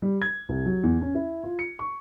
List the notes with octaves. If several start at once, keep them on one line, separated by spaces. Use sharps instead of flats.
G3
G#6
C2
F#3
E2
C#4
E4
F4
C#7
C#6